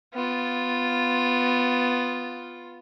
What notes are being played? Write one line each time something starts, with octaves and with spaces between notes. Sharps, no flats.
B3 F4